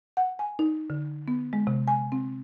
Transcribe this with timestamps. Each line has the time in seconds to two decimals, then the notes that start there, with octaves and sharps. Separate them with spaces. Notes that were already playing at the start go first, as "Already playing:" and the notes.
0.17 F#5
0.39 G#5
0.59 D#4
0.90 D3
1.28 B3
1.53 G#3
1.67 C3
1.88 G#5
2.12 C4